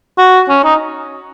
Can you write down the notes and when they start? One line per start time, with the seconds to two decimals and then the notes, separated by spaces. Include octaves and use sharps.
0.18 F#4
0.49 C#4
0.64 D#4